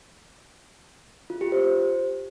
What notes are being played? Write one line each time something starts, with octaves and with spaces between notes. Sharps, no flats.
F4
G4
C5